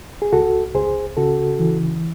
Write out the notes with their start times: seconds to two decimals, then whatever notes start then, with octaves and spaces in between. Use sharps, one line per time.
0.22 G#4
0.32 C#2 F#4 A4
0.75 C#2 G#4 C5
1.17 C#3 F#4 A4
1.59 E3